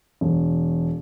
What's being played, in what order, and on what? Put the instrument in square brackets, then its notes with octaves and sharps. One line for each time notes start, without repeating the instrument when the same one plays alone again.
[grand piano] E1